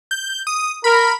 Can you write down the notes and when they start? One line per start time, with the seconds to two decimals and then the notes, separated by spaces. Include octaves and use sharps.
0.11 G6
0.47 D#6
0.84 A#4 B5